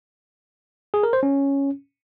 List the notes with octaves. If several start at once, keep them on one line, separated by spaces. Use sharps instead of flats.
G#4
A#4
C5
C#4